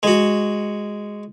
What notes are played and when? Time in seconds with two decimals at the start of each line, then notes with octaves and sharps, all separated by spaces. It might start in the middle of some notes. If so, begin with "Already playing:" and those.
0.03 G#3 F#4